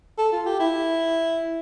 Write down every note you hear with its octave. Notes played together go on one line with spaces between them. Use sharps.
A4
F4
G4
E4